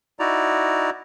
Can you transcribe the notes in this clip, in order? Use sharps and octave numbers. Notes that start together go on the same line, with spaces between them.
D#4 E4 F#4 D5 A#5